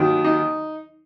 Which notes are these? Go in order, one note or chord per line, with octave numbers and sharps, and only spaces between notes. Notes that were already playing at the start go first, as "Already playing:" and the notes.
Already playing: D#2 D#3 F#3
D#4